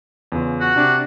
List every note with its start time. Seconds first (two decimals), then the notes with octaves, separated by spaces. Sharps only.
0.32 E2 C#3 F4
0.60 F#4
0.76 C3 D4